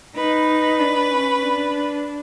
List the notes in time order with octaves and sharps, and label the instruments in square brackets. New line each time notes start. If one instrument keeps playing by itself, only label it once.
[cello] D#4 [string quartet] B4
[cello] D4
C#4
D4